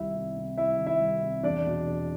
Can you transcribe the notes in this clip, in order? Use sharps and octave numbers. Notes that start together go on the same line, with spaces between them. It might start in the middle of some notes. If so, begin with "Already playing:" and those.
Already playing: C2 D#3 E4 E5
C3
C3
C2 E4 E5
D#3
E4 E5
C2
C3
E2 D4 D5
B2
E2